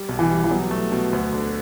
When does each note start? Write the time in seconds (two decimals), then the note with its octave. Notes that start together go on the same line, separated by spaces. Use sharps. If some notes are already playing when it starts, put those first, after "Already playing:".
Already playing: G3
0.09 B1
0.19 E3
0.30 G3
0.44 E3
0.51 B2 F#3
0.71 A3
0.92 B2
1.13 D2
1.33 D3